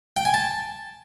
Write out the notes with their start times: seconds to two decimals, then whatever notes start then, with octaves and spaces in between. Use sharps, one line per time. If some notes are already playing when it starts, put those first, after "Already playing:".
0.17 G5
0.25 G#5
0.34 A5